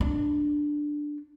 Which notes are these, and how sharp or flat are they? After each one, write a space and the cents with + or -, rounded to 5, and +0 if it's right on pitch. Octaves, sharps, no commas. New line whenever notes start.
D4 +5